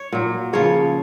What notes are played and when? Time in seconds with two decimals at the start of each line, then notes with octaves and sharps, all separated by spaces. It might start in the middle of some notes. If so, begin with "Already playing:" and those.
Already playing: C#5
0.12 A#2 F#3
0.53 C#3 F3 C#5